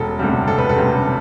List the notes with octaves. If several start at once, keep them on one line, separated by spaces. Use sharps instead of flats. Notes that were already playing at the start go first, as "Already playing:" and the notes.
Already playing: E1 A4
D2 C3 G3
E1 A4
B4
A4
D2 C3 G3